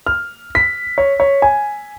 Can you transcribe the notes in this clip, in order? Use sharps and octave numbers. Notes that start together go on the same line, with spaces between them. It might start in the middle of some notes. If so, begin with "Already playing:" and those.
F6
B6
C#5
C#5
G#5